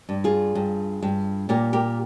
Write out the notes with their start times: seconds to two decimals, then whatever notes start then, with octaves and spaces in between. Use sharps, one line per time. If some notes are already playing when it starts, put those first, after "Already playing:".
0.09 G2
0.24 F4 G#4
0.55 G2
1.02 G2
1.49 A#2 G4 A#4
1.73 G4 A#4